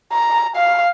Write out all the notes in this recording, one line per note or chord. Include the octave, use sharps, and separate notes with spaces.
A#5
F5